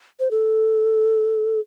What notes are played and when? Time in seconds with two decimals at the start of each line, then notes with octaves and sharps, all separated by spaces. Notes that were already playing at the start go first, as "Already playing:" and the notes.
0.20 C5
0.31 A4